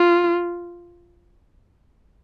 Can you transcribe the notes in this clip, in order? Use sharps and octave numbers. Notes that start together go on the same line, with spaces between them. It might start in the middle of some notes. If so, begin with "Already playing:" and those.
Already playing: F4